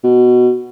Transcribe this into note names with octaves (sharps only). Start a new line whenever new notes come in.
B2